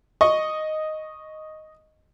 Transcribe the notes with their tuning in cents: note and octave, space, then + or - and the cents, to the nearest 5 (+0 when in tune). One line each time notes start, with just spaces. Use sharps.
D#5 +0 C#6 +0